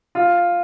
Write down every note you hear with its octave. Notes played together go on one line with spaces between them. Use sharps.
F4